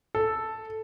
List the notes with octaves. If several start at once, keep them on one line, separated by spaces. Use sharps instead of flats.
A4